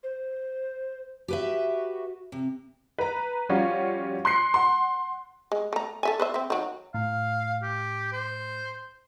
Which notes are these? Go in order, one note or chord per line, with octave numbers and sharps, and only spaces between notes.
C5
F#4 G4 B4 E5
C3
B4 A#5
F3 G3 C#4 F4 F#4
C6 F#6 C7 C#7
F#5 C6
G#3
A3 A#5
A4 E5 G#5
B4 C5 E5
C4 E5
D#3 F#3
A2 F5
G4
C5